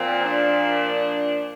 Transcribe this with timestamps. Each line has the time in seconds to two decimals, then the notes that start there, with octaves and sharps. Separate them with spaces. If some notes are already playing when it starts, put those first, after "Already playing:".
Already playing: A#2 F3 C4
0.24 D4